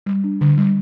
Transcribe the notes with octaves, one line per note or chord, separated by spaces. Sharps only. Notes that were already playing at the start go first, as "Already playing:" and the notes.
G3
D4
D3
G3